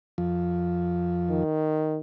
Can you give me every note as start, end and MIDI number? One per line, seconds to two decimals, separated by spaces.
0.18 1.44 41
0.18 1.44 53
1.29 2.00 51